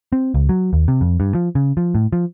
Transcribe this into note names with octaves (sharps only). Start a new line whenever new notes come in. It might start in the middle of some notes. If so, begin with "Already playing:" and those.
C4
C#2
F#3
D#2
C3
F2
G2
F3
C#3
F3
A2
F3